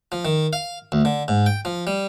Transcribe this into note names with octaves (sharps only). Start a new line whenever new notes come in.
F3
D#3
F5
D2
D3
G#2
G5
F3
G3